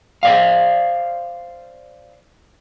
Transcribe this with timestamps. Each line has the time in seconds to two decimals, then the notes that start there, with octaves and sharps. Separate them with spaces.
0.23 C5 D5 F5